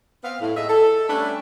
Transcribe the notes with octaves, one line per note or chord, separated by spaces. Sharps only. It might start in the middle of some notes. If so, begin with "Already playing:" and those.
B3 C4 F5
A2
A2 G#4 D#5 E5
A4
G3 A3 C#4 D4 B4 C#5